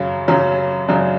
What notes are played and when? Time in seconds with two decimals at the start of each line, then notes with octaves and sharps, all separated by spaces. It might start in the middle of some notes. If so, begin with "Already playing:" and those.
Already playing: F#2 C#3 F#3
0.28 F#2 C#3 F#3 C#4
0.88 F#2 C#3 F#3 D4